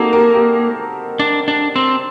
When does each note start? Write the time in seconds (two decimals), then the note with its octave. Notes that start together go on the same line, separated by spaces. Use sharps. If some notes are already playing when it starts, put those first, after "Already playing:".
Already playing: A#3 C4 D#4 F#4 G4 A4
0.13 G4 A#4
0.34 G4 A#4
1.19 D4
1.48 D4
1.76 C4